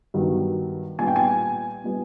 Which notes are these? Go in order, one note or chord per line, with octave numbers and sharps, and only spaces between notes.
G2 D#3 F#3 B3
A#2 G3 B3 G#5
G5
G#5
A#2 G3 B3